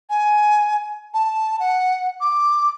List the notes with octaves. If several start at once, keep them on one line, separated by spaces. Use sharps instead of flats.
G#5
A5
F#5
D6